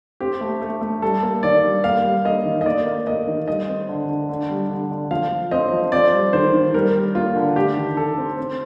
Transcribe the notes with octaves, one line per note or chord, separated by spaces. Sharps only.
C4 G4
A3
A3
A3
G3 A4
A#3
D#3 D5
G3
A#3 F5
G3
A#3 D#5
D#3
D#5
A#3 D5
A#3
A#3 D#5
D#3
G3 D#5
C4
D3
D3
D3
G3
D3
D3
F3 F5
F3
C4 D#5
F3
C4 D5
G3
D#3 C5
D#3
G3 A#4
G3
A#3 F4
D3
A3 G4
D#3
D#3 A4
C4
C4